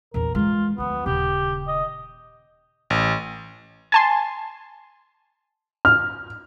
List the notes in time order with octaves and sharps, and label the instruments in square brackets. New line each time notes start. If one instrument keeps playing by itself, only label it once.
[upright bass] A#1 E2 [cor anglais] A#4
[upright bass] E3 G#3 [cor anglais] F4
[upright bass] D2 F3 [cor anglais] B3
[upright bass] D#1 C#3 [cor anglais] G4
[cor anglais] D#5
[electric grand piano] A1
[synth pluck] G#5 A5 C6
[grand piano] F6